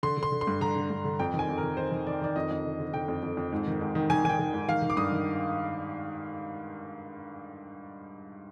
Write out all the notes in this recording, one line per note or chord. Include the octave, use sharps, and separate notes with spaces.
D3 C6
D3
C6
D3
C6
G2
D3 A#5
D3
G2
D3
F2 G5
D#3
G#5
F2
A#4
D#3
D#3 C5
D#3
D#3 D5
D#3 D5
F2 D#5
F2
D3
D3
D3 G5
F2
F2
F2
G#2
D#3
G#2
D#3
D#3 G#5
D#3 G#5
G5
D#3
G#2
D#3 F5
D#3
D6
G2 D#6
D#3